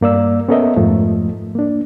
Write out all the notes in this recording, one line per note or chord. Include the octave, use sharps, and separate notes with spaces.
G2 A#3 D5 E6
B3 C#4 A4 A#4 D#5 E5
F2 G#2 F3 A3
A#3 D4